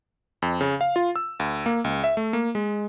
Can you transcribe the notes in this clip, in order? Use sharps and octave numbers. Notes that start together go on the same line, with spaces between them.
F2
C#3
F5
F4
E6
D2
A#3
C#2
E5
A3
A#3
G#3